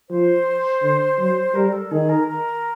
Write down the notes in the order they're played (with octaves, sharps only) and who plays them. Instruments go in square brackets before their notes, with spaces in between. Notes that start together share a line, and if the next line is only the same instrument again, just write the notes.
[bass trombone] F3 [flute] C5
[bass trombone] D3
F#3
[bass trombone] G3 [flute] A#4
[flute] A4
[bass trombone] D#3 [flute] G#4
[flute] A#4
A#4